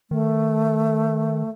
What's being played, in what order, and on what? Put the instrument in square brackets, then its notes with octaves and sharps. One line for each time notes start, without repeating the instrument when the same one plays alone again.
[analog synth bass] D#3 [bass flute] A3